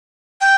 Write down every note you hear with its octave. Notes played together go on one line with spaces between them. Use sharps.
G5